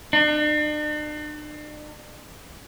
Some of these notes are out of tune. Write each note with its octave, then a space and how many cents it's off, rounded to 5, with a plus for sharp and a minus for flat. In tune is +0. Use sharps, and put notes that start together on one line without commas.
D4 +45